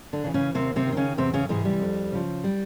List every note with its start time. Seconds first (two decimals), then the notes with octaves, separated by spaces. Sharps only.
0.13 D3 D4
0.24 C#3 E3
0.34 C#3 C#4
0.54 D#2 C3 C4
0.76 C3 C4
0.86 D#3
0.92 C4
0.97 C#3 C#4
1.17 E2 C3 C4
1.33 C#3 C#4
1.49 G#2 C3 E3 G#3
1.65 G3
1.81 F2
2.12 C#3 F3
2.44 G3